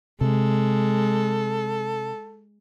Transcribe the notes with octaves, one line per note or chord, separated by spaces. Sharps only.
C3 G#3 A4